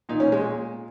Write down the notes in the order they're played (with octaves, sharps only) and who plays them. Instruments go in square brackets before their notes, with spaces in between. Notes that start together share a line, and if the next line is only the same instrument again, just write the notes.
[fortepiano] A#2 D#4
C#4
A#2 G#3